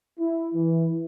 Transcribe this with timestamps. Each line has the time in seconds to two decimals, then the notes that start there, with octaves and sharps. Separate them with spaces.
0.20 E4
0.54 E3